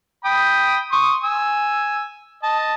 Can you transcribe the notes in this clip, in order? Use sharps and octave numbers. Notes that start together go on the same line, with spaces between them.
G5 B5 D#6
C6 C#6 D#6
G#5 E6
D#5 A5